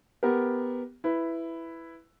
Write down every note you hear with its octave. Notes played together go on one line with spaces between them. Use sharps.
B3 G4 A#4
E4 B4